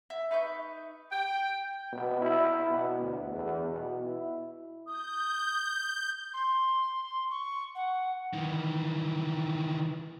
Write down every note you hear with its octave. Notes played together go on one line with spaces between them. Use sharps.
E5
D#4 B4 C#6 G6
G5
B2
E4
B2
D2
E2
B2
E4
D#6 G6
C6
C#6
F#5
D#3 E3